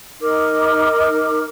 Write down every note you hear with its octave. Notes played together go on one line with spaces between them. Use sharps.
D#4 A#4 D6